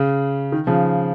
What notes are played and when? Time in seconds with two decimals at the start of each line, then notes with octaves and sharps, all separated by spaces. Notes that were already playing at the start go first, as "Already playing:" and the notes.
Already playing: C#3
0.52 D#3
0.67 C#3 F3